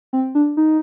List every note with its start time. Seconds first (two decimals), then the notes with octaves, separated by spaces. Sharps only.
0.13 C4
0.35 D4
0.57 D#4